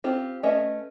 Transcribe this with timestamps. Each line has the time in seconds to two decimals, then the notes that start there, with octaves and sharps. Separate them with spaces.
0.04 C4 F4 G4
0.43 A3 C#4 B4 D#5 E5